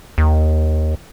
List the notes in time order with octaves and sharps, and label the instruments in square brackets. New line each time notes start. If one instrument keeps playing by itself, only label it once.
[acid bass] D#2